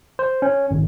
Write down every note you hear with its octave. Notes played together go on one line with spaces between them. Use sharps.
C5
C#4
G#1